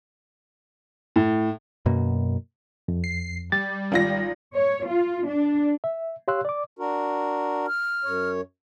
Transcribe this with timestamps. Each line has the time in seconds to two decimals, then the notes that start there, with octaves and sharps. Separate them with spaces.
1.16 A2
1.86 F#2 B2 A#3
2.88 F2
3.04 C7
3.52 G3 A6
3.92 G#1 F4 A#6
4.54 C#5
4.87 F4
5.27 D4
5.84 E5
6.28 G4 C#5 F5 C6 E6 F#6
6.45 D5 D6
6.79 D4 F#4 A#4
7.67 F6
8.04 F#2 C#5